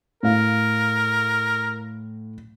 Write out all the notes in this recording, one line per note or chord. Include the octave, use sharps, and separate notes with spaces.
A2 A#4 F5